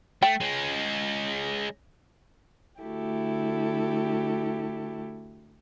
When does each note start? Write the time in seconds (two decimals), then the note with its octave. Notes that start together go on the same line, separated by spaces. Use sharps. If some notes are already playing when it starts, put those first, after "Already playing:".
0.23 A3 G5
0.41 G#3 C#4
2.82 D3 A3 E4 F#4 G4 A4